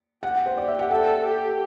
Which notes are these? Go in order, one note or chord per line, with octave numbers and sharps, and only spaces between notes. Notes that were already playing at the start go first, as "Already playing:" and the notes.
G4 F#5
C5
G4 D5
E5
F#5
A4 G5
G4